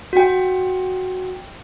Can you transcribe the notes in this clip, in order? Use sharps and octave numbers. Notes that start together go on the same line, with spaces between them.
F#4 G5